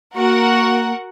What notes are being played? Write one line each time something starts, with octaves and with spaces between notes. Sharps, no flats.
A#3 F#4 A#4 F#5